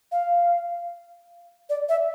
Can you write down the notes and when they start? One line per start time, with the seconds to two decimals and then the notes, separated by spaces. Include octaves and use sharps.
0.12 F5
1.70 D5
1.89 E5